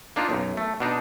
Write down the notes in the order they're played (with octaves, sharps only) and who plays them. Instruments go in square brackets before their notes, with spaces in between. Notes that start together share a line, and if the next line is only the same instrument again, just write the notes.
[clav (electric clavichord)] A#3 D4 D#4 F4
B1 F#2
A3
B2 D4 D#4